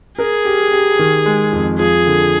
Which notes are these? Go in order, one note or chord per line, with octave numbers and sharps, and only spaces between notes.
G#4 A#4
G4
G4
D#3
G#3
F2
F3 G#4
D3